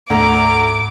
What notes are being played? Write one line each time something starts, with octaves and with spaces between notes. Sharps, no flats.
D2 G#2 A#5 D6